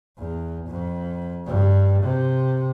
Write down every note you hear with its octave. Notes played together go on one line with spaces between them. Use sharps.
E2
F2
G2
C3